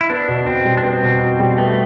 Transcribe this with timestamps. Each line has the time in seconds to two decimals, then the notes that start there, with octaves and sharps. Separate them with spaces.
0.01 E4
0.10 B3 D4
0.28 B2
0.46 B2 C4
0.65 G3
0.77 D4
0.83 B3 C4
1.02 B2
1.21 B2
1.40 G3
1.58 A3 B3